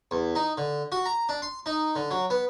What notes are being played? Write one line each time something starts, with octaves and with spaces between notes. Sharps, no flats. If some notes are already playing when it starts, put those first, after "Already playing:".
E2
D#4
D3
F#4
A#5
D4
C6
D#4
D3
F#3
B3